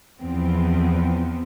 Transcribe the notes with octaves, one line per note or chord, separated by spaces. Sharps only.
E2 F3 B3 C4